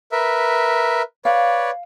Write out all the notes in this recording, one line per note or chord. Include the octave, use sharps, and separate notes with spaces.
A#4 B4 E5
B4 C#5 D5 F5